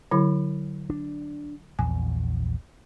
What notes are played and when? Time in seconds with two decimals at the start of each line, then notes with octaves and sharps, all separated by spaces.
0.11 D3 F#3 E4
0.90 D4
1.79 A#1 E2 G#5